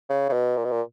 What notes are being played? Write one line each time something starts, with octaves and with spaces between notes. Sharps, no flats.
C#3
C#3
B2
A#2
B2
A#2